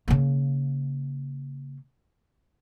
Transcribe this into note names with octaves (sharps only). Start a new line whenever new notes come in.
C#3 A#3